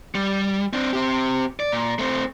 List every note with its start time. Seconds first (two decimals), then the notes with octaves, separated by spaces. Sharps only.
0.15 G3
0.73 C4 D4
0.93 C4 G4
1.60 D5
1.72 A#2
1.99 A3 C4